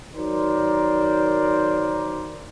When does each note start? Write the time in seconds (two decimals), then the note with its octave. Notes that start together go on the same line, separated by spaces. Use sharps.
0.15 D#3 F#3 A#4 C5 D5